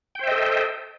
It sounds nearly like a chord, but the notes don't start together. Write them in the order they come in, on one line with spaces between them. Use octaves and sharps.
G5 C5 E5 D#5 A4